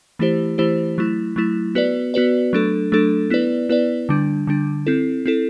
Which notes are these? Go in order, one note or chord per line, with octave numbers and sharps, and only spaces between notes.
E3 A3 E4 G4 C5
E3 A3 E4 G4 C5
F#3 A3 E4
F#3 A3 E4
B3 F#4 B4 D5
B3 F#4 B4 D5
F#3 A3 D4 A4
F#3 A3 D4 A4
B3 E4 B4 D5
B3 E4 B4 D5
D3 G3 D4
D3 G3 D4
C4 E4 A4
C4 E4 A4